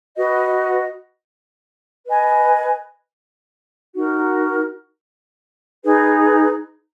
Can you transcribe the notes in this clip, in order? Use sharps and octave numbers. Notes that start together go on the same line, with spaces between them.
F#4 B4 D#5
B4 D#5 G#5
D#4 F#4 A#4
D#4 G#4 B4